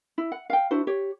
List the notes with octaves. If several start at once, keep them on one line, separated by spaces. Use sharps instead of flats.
E4
F#5
F5 G5
D4 E4 F#4 C5
G4 C#5